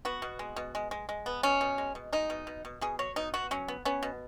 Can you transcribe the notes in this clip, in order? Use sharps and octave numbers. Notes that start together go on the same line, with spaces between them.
B3 F#4
B2
G#3
B2
G#3
G#3
G#3
B3
B2 C#4
B2
G#3
B2
G#3 D#4
B2
B2
B2
B2 G#4
F#3 C#5
B2 D#4
B3 F#4
F#3 C#4
B3
B3 C#4
B2